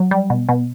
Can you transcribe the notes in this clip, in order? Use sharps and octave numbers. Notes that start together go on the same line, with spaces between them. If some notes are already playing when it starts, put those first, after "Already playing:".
Already playing: F#3
G3
B2
B2